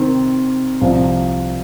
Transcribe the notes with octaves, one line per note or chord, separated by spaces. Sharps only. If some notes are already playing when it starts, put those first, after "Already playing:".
Already playing: C3 D#3 C4
C2 C3 F3